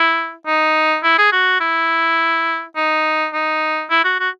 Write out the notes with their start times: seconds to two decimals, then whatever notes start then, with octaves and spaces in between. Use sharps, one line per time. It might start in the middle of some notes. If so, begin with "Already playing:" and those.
Already playing: E4
0.47 D#4
1.03 E4
1.18 G#4
1.32 F#4
1.61 E4
2.76 D#4
3.33 D#4
3.90 E4
4.05 F#4
4.20 F#4